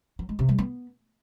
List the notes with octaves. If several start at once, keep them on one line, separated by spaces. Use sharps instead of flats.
F#3
G#3
C3
G3
B3